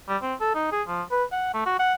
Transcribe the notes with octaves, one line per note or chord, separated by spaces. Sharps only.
G3
C4
A4
D#4
G#4
F3
B4
F#5
A3
F#4
F#5